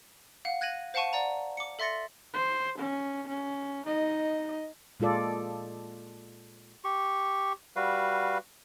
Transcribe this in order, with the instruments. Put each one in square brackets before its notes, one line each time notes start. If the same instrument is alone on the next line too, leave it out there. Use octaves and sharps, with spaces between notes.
[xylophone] F5 F#5
F#6 G#6 A#6 D#7 F#7
C5 F5 F#5 A5 C#6 D#7
D5 F#5 A#5
D6 C#7
A4 E5 C6 A6 A#6 C#7
[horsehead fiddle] C5
C#4
C#4
D#4 D#5
[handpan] A#2 G#3 F4 A4 D5
[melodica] G4 C#6
G3 F#4 B4 F5